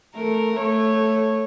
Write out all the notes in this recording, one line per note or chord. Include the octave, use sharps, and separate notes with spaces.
A3 A#4
A3 C#5